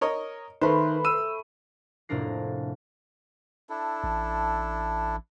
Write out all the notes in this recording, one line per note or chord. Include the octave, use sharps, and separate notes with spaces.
A#4 C#5 D#5
D#3 A3 B4 C5 B5 C6
E6 D#7
F1 A2 A#3 D4 A#4 C7
D4 E4 A4
A1